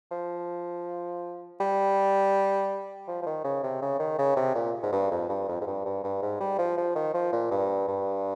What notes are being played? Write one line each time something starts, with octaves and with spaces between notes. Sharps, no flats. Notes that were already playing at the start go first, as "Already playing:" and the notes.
F3
G3
F3
F3
D#3
C#3
C3
C#3
D#3
C#3
C3
A#2
G#2
G2
F2
G2
F2
G#2
G2
G2
G2
G#2
G3
F3
F3
D#3
F3
A#2
G2
G2